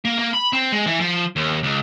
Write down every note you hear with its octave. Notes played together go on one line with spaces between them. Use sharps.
A#3
A#3
B5
C4
G#3
E3
F3
D#2
C#2